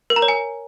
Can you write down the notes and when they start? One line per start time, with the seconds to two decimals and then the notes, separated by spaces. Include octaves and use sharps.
0.10 A#4
0.16 A#5
0.22 C#5
0.28 G#5